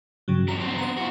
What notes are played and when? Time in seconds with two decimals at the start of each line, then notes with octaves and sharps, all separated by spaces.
0.28 G2 C#3 F#3
0.48 E2 F#3 A#5
0.61 B3 C4
0.78 C5 A#5
0.98 E4 F#4